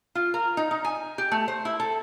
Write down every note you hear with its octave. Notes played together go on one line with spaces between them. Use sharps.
F4
A#4
D#4
D#4
G#5
G4
A3
C5
E4
A4